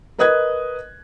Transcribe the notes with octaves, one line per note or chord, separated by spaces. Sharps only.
A#4 B4 D#5 D#6 F#6 G#6